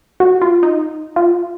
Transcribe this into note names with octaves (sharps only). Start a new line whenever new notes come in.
F#4
F4
D#4
F4